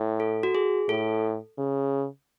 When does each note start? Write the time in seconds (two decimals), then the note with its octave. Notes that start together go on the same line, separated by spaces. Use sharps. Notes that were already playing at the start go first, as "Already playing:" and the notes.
Already playing: A2
0.20 A4
0.43 F#4
0.55 G#4
0.89 A2 A4
1.58 C#3